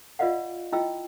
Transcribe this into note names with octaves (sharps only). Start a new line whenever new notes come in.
F4 B4 D5 D#5 F5 F#5
E4 F4 D#5 G5 E6